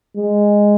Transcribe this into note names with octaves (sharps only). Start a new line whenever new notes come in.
G#3